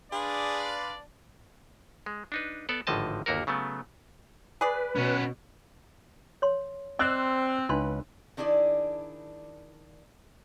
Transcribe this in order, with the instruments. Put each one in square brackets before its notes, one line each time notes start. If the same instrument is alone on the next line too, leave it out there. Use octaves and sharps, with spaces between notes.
[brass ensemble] D4 D5 [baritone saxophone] G#4 [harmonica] B4 F5 C6
[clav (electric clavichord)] G#3
D4 D#4 B4
B3 A4 D5
G#1 A2 D3 F3 D#5 A5
G1 D#2 A#3 F#4 A#4
C#3 F#3 A3 B3
[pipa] G#4 D5 [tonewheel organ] B4
[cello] B2 [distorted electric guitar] B3 C#4
[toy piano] C#5 C6
[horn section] C4 [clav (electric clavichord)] C5 D5 G5 [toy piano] D#5 [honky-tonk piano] E6 F#6
[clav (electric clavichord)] C#2 B4 [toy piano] D4 D#4 C6
[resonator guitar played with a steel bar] D#3 D4 E4 G#4 D5